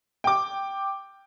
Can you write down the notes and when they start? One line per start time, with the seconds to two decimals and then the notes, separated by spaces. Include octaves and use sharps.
0.24 G5 D6